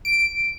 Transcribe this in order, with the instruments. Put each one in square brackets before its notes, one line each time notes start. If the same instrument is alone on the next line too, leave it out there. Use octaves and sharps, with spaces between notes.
[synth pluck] D7